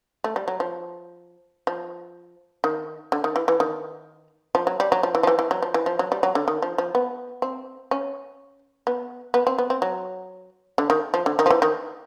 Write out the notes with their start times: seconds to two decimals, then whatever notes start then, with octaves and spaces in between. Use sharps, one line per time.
0.24 A3
0.36 G3
0.48 F#3
0.60 F3
1.67 F3
2.64 D#3
3.12 D3
3.24 D#3
3.36 E3
3.48 E3
3.60 D#3
4.55 F3
4.67 F#3
4.80 G3
4.92 F#3
5.03 F3
5.15 E3
5.23 F3
5.27 E3
5.39 E3
5.51 F#3
5.62 F3
5.74 E3
5.86 F3
5.99 F#3
6.12 G3
6.23 F#3
6.35 D3
6.48 D#3
6.62 F3
6.78 F3
6.95 B3
7.42 C4
7.91 C#4
8.87 B3
9.34 B3
9.47 C4
9.58 B3
9.70 C4
9.82 F#3
10.78 D3
10.90 D#3
11.14 F3
11.26 D3
11.39 D#3
11.46 F3
11.50 E3
11.62 D#3